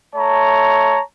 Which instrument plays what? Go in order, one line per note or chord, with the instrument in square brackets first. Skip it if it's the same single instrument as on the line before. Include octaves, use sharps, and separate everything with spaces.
[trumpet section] A3 C#5 A5 A#5